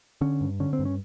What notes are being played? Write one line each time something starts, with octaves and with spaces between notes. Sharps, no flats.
D3 C#4
G2
D3 C#4
C4
G2
C#4